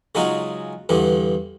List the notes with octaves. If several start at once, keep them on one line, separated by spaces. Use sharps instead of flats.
C#3 F#3 G#3 D#4 F4 F#4
E2 G2 D3